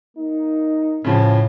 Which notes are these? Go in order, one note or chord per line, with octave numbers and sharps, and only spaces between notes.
A#3 D#4
A2 C#3 F3